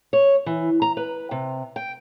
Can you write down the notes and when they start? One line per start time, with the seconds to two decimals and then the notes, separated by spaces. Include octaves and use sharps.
0.13 C#5
0.46 E3
0.82 A#5
0.97 B4
1.31 C3
1.76 G5